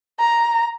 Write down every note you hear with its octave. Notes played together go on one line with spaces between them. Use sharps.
A#5